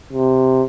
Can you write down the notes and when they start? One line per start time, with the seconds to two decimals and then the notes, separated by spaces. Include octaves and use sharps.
0.13 C3